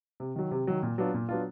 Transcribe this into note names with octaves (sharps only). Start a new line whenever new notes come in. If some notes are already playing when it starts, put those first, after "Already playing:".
C3
D#3 F#3
C3
D#3 F#3
A#2
F#3 B3 D4 F4
A#2
F#3 B3 D4 F4